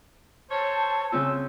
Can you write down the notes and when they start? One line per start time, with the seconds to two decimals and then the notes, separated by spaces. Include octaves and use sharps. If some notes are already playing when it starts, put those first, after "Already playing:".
0.51 C5 C#5 A5
1.12 C#3 C4 F4 E6